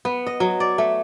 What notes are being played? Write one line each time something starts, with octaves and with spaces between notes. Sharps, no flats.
B3
D#5
F#3
D5
A3